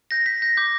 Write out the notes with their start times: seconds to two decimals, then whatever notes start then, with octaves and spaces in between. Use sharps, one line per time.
0.11 G6 A#6
0.26 G6 B6
0.42 G6 A#6
0.57 D6 G6